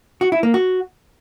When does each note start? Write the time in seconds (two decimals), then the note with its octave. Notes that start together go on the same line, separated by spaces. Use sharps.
0.21 F#4
0.32 E4
0.43 A#3
0.54 F#4